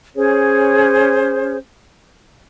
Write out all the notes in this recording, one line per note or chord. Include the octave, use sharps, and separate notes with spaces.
C#4 G#4 C5 C#5